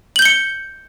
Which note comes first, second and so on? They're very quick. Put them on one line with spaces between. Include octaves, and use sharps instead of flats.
F#7 G6 G7 C#7